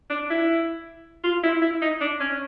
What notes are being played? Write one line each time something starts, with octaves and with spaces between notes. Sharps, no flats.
D4
E4
F4
E4
E4
D#4
D4
C#4